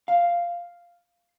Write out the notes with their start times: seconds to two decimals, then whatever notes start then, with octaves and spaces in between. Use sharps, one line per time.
0.08 F5